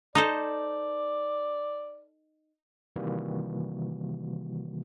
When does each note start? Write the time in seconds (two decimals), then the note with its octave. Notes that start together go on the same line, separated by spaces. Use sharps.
0.15 D#4 A4 C5 D5
2.96 C3 D#3 E3 G3 A#3 F#4